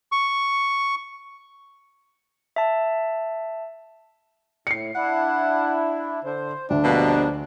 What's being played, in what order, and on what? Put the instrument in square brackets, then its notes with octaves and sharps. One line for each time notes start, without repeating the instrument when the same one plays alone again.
[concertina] C#6
[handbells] E5 A5
[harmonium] A2 [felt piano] C7 C#7
[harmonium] D4 E4 [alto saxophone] F#5
[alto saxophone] D3 [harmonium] C5
[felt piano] D2 [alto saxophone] D4
[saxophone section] G2 B2 [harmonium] F3 A#3